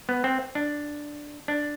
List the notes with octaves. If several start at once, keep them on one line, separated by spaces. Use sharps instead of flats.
B3
C4
D4
D4